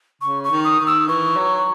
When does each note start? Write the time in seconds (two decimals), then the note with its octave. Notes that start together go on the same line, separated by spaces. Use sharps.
0.22 C#3 C#6
0.44 C#6
0.51 D#3
0.64 D#6
0.79 D#3
0.87 E6
1.08 E3 C#6
1.37 F#3